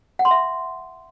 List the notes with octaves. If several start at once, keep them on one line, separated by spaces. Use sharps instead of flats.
F#5
C6
E5